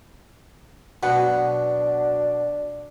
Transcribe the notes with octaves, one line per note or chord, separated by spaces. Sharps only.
B2 F#3 B3 D4 F#5